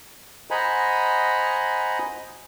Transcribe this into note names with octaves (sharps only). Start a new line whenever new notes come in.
C5 D#5 F#5 G#5 A#5 B5